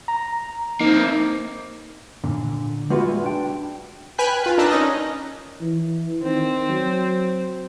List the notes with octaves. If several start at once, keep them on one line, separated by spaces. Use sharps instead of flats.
A#5
A#3 C4 D#4
A#2 D3
G3 G#3 F4 F#4 B4 E5
D4 G5
B4 G5 G#5 F6 F#6 B6
F4 B4
D4 D#4 A#4 A5 E6 F#6
C#4 D#4 D#5 A#6
E3
D#3 C4
F#3